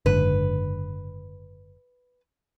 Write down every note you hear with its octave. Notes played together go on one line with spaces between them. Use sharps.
F#1 G#2 D3 B4